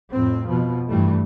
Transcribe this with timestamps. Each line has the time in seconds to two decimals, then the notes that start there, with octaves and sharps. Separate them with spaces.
0.12 F2 A2 C4
0.47 B2 F3
0.88 G2 E3 G3 A3